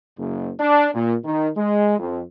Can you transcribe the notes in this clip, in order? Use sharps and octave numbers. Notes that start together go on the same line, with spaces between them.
F#1
D4
A#2
D#3
G#3
F2